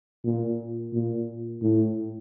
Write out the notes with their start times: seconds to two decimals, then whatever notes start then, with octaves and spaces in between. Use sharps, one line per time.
0.25 A#2
0.93 A#2
1.62 A2